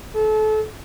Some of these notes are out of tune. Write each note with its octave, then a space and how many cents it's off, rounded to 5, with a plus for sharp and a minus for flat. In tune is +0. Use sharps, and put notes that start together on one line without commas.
A4 -30